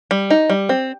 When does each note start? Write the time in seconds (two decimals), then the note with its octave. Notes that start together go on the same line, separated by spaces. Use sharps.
0.11 G3
0.30 D#4
0.50 G3
0.69 C4